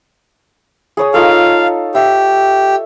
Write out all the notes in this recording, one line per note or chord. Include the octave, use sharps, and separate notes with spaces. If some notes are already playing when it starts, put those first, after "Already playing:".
G#4 C#5 D#6
D#4 F4 A4 F5
G4 E5